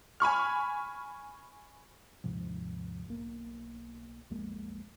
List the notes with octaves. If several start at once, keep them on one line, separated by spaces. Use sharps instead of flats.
G#5 B5 C#6 F6
D#2 G#2 C3 F3
B1 A#3
B1 F2 G#3 A#3